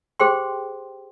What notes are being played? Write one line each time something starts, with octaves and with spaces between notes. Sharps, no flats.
G4 G#4 C5 G5 C6